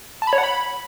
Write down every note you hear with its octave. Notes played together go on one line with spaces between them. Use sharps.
A5
B5
C#5
F#5
B5